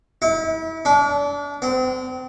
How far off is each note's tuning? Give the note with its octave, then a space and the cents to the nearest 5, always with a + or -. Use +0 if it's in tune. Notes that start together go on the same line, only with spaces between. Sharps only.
E4 -35
D4 -35
C4 -35